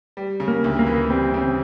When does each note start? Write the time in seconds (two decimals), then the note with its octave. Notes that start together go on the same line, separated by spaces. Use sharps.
0.17 G3
0.40 C#3
0.48 A#3
0.64 D2
0.79 A#3
0.87 E3
1.10 G3 C4
1.34 C#3
1.42 C4